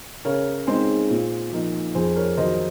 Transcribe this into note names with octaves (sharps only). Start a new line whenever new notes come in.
C#3 A#4 C#5
G#3 C4 D#4 G#4 C5
A#2
F3 A#3 D#4
F2 G#4 C5
A#4 C#5
D#3 F#3 C5 D#5